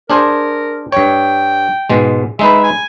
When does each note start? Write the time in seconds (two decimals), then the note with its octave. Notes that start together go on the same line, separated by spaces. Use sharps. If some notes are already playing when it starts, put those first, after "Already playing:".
0.10 D4 G#4 A#4 C5
0.92 G2 C#5 G5
1.90 G#2 B2 G#3
2.39 G#3 D#4 B4 E5
2.63 G#5